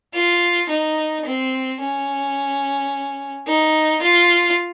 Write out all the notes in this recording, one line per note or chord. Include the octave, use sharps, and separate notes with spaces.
F4
D#4
C4
C#4
D#4
F4